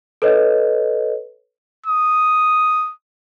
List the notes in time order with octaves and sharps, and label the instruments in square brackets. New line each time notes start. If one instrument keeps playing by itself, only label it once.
[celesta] A4 B4 C#5 D#5
[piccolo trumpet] D#6